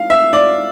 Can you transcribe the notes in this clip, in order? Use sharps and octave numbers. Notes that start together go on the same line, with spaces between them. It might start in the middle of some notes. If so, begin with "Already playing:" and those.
Already playing: F5
E5
D5